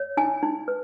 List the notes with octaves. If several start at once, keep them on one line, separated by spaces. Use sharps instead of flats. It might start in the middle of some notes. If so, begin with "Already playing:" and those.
Already playing: C#5
D#4 G#5
D#4
B4